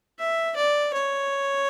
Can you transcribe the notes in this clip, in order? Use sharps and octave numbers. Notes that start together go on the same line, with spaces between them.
E5
D5
C#5